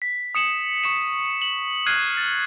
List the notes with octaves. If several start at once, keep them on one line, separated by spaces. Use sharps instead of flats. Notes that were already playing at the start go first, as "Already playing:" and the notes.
B6
D#6 C#7 E7 F#7
C#6 C#7 E7
F#7
F6 F#6 G#6 C7 D#7
A6